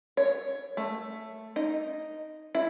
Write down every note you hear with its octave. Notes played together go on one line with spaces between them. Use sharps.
C#5
A3
D#4
E4